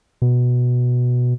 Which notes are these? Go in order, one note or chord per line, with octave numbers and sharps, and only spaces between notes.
B2